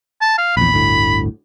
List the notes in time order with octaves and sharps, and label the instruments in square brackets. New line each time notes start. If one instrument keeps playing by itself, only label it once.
[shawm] A5
F5
[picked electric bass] A#1 E2 [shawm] B5
[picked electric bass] G1 D2 A2